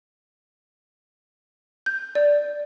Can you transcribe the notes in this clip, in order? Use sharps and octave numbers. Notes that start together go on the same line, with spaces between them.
G6
D5